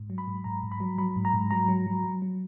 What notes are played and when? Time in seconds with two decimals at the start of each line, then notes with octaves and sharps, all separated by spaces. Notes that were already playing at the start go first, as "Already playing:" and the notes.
Already playing: G#2
0.10 F#3
0.18 B5
0.28 G#2
0.44 G#2 A#5
0.63 G#2
0.72 B5
0.80 F#3
0.98 F#3 B5
1.16 G#2
1.25 A#5
1.34 G#2
1.51 F#3 A#5
1.68 F#3
1.86 F#3
2.04 F#3
2.22 F#3